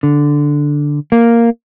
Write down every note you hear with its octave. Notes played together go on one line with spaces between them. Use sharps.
D3
A#3